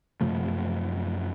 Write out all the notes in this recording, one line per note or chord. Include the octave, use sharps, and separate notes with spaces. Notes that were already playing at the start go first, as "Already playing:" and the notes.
F#2 C3 F3 A3